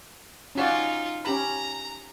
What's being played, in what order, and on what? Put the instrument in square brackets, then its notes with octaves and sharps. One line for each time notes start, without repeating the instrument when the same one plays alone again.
[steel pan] C#4 F#4 D5 [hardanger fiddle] D#4 F4
[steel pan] C#4 G4 B5 [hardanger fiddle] A#5